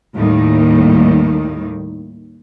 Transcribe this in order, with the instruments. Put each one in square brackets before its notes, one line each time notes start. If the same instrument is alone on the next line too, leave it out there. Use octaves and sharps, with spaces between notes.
[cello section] D#2 A2 D#3 G3